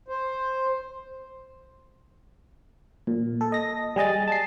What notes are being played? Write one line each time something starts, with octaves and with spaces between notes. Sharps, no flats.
C5
A#2
A4
D#5 A#6
G3 G#4 D#5 A6
A5 A6 C7